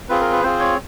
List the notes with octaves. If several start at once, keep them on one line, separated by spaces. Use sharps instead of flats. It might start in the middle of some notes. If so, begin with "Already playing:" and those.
C4 F4 G#4 B4
A#4
B4
C4 F4 G#4 C5
C#5